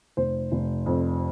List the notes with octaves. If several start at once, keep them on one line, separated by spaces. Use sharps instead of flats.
F1 C5
F1
F2